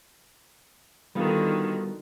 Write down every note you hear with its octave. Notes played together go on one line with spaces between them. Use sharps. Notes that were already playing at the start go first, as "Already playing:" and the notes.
D3 D#3 G3 B3 F4 F#4